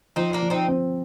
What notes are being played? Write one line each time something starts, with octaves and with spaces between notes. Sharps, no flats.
F3 C4 D#4
A#3 D4
F3
C4 D#4
C4